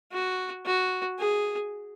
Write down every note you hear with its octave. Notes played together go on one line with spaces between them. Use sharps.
F#4
F#4
G#4